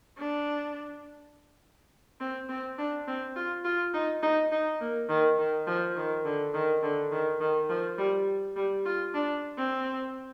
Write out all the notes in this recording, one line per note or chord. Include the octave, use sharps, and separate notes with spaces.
D4
C4
C4
D4
C4
F4
F4
D#4
D#4
D#4
A#3
D#3
D#3
F3
D#3
D3
D#3
D3
D#3
D#3
F3
G3
G3
F4
D4
C4